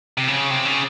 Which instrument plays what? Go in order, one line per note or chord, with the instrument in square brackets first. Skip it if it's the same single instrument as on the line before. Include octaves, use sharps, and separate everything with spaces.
[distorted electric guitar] C3
C#3
C3
C#3